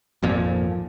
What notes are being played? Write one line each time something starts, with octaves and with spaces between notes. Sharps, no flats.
G#1 F2 A#2 F3